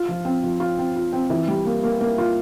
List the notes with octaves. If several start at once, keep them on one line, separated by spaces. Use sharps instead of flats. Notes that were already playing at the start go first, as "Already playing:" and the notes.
Already playing: F4
F3
C4
F3
F4
C4
F4
C4
E3
G3
A#3
A#3
A#3
F4